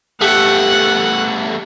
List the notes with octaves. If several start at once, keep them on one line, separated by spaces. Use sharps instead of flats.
A3 B3 G4 F#5